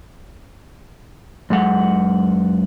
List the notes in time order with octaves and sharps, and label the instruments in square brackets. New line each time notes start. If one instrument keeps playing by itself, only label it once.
[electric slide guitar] F#2 G#3 F#5